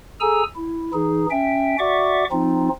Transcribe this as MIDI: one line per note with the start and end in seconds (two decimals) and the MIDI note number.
0.20 0.43 68
0.20 0.43 69
0.20 0.43 80
0.20 0.43 82
0.20 0.43 88
0.56 0.91 64
0.93 1.26 52
0.93 1.26 63
0.93 1.26 68
1.31 1.76 61
1.31 1.76 76
1.31 1.76 79
1.79 2.24 66
1.79 2.24 74
1.79 2.24 76
1.79 2.24 78
1.79 2.24 85
1.79 2.24 86
2.32 2.69 53
2.32 2.69 60
2.32 2.69 63
2.32 2.69 65